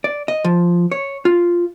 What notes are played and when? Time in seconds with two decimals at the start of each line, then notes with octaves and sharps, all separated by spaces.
0.04 D5
0.28 D#5
0.44 F3
0.92 C#5
1.25 F4